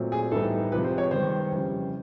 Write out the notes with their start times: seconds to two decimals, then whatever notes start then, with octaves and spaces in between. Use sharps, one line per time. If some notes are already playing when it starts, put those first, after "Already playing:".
Already playing: A#2 F#3 A3 C4
0.12 G#4
0.32 A2 E3 G3 B3 D#4 A4
0.72 C3 F3 G#3 B4
0.84 C5
0.98 C#5
1.11 D#3 G3 B3 C5
1.51 F2 C#3 E3 G3